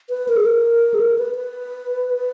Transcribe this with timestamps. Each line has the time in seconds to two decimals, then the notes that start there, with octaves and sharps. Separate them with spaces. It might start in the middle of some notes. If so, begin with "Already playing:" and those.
0.10 B4
0.28 A#4
0.36 G#4
0.45 A#4
0.94 G#4
1.00 A#4
1.18 B4
1.35 B4